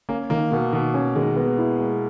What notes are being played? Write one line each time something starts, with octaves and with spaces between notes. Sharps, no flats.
A#3 C#4
D#3 A#3
B2 A#3
B2 D#3
C#4
D#3 G#3
B3
E4
G#3